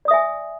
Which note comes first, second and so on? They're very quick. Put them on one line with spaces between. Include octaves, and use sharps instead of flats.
D5 D#6 E5 G#5